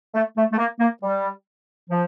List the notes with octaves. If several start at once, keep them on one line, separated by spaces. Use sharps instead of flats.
A3
A3
A3
A#3
A#3
G3
F3